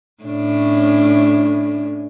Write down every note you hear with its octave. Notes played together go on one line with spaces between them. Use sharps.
A2 C#4 D4